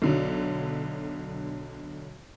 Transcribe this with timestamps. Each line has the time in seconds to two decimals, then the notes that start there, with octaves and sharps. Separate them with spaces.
0.02 B1 D3 F#3